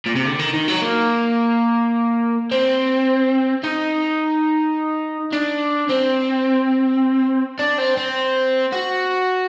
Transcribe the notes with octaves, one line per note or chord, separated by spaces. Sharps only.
A#2
C3
D3
D#3
D#3
F#3
A#3
C4
D#4
D4
C4
D4
C4
C4
F#4